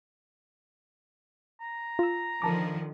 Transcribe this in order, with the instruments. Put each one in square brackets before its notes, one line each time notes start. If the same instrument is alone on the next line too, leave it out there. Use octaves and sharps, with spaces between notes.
[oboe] A#5
[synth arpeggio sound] F4 E6
[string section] D3 D#3 F3 [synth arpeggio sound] A#4 A5 D6